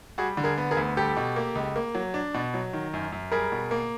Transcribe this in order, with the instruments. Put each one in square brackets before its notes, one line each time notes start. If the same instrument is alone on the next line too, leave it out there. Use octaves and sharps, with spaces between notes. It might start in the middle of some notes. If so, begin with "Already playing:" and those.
[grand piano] G3 F#4 G#4
D3
G#4 A#4
B3
G#4 A#4
D2
G3 G4 A4
B2
A#3
C#2
A#3
F#3
D4
B2
F#3
D#3
F#2
F#2
G3 G#4 A#4
B2
A#3